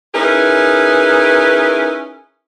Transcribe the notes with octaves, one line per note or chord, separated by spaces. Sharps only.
C#4 D#4 E4 G#4 A#4 B4